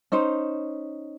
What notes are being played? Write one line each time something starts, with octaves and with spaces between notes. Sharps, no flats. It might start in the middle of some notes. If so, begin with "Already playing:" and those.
C#4 D#4 C5